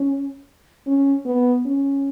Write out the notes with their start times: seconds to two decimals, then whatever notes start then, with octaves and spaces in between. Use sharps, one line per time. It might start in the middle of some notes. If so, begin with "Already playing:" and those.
Already playing: C#4
0.87 C#4
1.26 B3
1.66 C#4